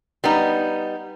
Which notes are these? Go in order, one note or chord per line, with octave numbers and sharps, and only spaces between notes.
G3 B3 D#4